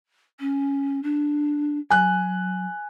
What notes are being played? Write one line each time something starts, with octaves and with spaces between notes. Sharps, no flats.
C#4
D4
F#3 G#5 F#6